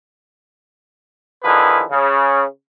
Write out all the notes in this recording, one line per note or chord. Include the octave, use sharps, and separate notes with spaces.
D3 D#3 F3 E4 G#4 B4
C#3